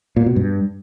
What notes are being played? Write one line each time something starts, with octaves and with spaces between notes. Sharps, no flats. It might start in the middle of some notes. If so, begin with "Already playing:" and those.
A#2
B2
G2